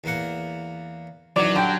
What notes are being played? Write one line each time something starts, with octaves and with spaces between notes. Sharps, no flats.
E2 A#3 F#5
F#2 D#3 E3 F#3 D5
G2 D3 G5